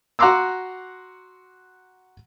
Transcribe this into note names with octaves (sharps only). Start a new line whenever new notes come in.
F#4 F#5 A#5 C6 D6 E6